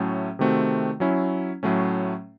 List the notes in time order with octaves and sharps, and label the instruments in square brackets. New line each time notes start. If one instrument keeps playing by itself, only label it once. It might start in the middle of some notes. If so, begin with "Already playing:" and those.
Already playing: [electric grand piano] A2 F#3 A3 C#4
C3 D#3 A3 C4 F#4
F#3 C#4 E4
A2 F#3 A3 C#4